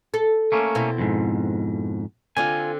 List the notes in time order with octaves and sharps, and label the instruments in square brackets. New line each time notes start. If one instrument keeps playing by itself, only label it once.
[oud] A4
[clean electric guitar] A3 A#3 C#4
[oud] B2 C4 E4
[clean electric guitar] F2 G#2
[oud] D3 C4 [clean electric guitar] F4 G#5